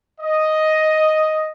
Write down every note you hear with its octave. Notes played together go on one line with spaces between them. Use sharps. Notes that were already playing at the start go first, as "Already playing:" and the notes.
D#5